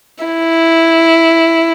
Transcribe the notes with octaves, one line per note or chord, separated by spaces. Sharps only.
E4